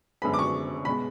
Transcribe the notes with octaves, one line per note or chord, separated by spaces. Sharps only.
F#2 D3 G#3 B3 B5
D6
C#6
B2 G#3 B5